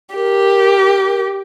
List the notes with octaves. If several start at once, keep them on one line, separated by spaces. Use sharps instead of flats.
G4 A#4